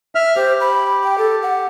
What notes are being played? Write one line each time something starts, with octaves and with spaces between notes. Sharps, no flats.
E5 F6
G4 C5
B5
G5
A4
F#5